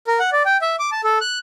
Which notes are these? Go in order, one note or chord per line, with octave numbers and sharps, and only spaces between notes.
A#4
F#5
D5
G5
E5
D6
A5
A4
F#6